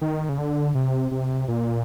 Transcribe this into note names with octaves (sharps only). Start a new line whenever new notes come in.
D#3
C#3
D3
C3
C3
A#2